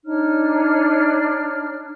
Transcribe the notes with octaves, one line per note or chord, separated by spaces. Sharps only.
D4 D#4 C#5 F6